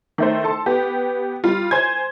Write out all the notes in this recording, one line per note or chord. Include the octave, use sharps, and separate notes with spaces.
D#3 A3 C5
A4 A5 C6
B3 G4
G3 F4
C5 G#5 G#6